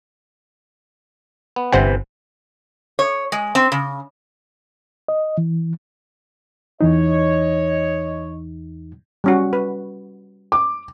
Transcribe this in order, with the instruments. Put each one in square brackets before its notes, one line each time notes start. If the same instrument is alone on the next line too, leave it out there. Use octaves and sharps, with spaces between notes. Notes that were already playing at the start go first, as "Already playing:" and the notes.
[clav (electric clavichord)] B3
[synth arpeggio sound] G1 C5 F#5 [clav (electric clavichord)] C3 E3
[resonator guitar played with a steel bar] C#5
G#3
C4
C#3
[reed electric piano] D#5
E3
[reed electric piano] E2 E3 D#4 [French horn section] C#5 D#5
[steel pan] G3 C#4 F#4
B4
[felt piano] D6